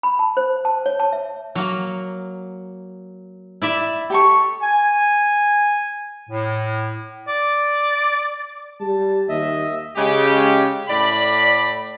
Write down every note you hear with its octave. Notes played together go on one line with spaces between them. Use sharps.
B5
A5
C5
A5
C#5
A5
E5
F#3 A#3
E4 D5 E5
G4 A4 C#6
G#5
A2
D5
G3 A5
D#2 D#5 E5
C#3 G#3 G4
A2 D5 B5